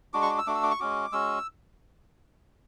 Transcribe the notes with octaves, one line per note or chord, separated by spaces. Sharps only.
G#3 D4 F#4 D6
C#6
D6
E6
A3 D4 F#4 D6
E6
D6
C#6
G#3 C#4 F#4 D6
G#3 C#4 F#4 E6